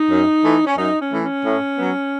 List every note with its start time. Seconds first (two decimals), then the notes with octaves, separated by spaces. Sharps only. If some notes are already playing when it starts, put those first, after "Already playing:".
Already playing: D#4
0.10 F#2
0.43 E3 A3
0.66 C#4
0.77 F#2 D#4
0.99 C#4
1.11 E3 A3
1.22 C#4
1.44 A2
1.78 F#3 B3